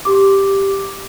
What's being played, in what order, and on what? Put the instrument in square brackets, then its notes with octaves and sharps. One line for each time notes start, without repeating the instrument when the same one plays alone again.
[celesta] G4 D6